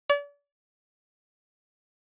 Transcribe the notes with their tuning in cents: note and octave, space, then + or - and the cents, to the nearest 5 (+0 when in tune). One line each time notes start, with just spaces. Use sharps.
D5 -40